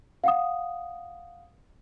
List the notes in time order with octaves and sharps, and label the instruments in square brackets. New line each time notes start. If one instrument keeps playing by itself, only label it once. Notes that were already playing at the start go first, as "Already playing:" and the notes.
[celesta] F5 F#5 D#6